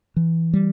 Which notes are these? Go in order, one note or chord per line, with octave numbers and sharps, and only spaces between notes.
E3
G3